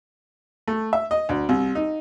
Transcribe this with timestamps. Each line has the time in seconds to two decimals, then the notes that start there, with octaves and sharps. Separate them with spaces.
0.68 A3
0.93 E5
1.11 D#5
1.29 D2
1.49 C2
1.75 D#4